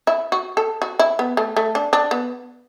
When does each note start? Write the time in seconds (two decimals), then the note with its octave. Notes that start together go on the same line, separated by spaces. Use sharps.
0.07 E4
0.32 F#4
0.57 A4
0.82 F#4
0.99 E4
1.19 B3
1.37 A3
1.57 A3
1.75 D4
1.93 D4
2.11 B3